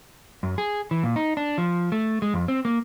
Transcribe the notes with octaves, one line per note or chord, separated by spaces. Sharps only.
F#2
G#4
E3
A#2
D#4
D4
F3
A3
G#3
F2
C4
A#3